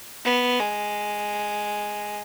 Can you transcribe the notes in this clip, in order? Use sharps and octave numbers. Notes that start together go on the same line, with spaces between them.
B3
G#3